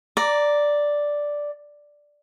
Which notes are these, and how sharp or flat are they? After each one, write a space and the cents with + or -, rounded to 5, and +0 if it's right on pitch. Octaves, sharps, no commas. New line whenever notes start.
D5 +0 A#5 +0 D6 -20